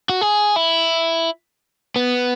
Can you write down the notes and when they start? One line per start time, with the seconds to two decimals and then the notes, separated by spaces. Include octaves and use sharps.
0.09 F#4
0.21 G#4
0.56 E4
1.96 B3